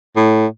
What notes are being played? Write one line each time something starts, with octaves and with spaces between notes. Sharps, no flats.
A2